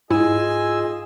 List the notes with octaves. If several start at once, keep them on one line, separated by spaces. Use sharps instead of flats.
G#2 E4 F4 G#4 D#5 G#5 E6